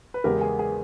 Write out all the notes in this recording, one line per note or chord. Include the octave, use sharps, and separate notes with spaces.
B4
E2 C#3 G#3 G4 A#4
G#4
G#4